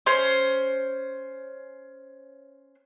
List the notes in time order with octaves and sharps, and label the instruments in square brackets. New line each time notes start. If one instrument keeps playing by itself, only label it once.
[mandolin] C#4 C5